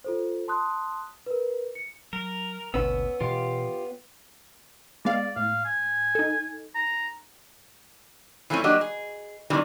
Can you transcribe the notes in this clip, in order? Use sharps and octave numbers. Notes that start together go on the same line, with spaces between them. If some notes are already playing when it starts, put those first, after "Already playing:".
F4 A4 C5
A5 C6 D#6 F#6
A#4 B4
C#7
F#3 A#4
G#1 D2 B2 B3 C#4 B4 E6
B2 E3 F4 G4 F5
G#3 B3 D5 F5
A2 F5
G#5
D#4 A4
A#5
E3 F3 A3 C4 C#4
F#3 A#3 D4 F#4 G4 D#5
G#4
C3 D#3 E3 G3